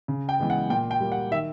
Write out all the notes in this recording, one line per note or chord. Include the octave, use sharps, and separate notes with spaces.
C#3
G5
E3 G#3 B3
F#5
A#2 G5
G5
G3 A#3
F#5
D#3 E5